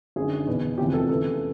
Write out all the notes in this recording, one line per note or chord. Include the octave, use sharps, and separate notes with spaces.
G#1 F#2 D3 G#4
E2 B2
F1 E2 C3 F3 G4
A4
E2 C#3 E3 A4